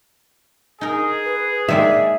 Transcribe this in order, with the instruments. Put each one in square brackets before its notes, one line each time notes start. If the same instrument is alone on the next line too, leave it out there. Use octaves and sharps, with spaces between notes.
[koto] D#4 A#4 [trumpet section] G#4
[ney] B4
[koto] D#3 G#3 A#3 [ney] D5 [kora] E5